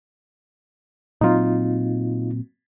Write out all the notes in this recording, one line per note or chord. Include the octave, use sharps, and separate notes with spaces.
A#2 F#3 C4 D#4 F4